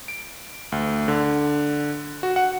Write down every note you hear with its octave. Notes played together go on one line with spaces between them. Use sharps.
D7
D2
D3
F#4
F#5